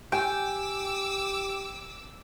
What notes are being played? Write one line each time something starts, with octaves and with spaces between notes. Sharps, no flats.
G4 G5 G#5 D6 E6